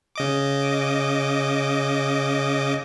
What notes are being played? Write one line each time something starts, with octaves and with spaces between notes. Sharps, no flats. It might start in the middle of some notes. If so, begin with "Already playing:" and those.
C#3 D#5 D6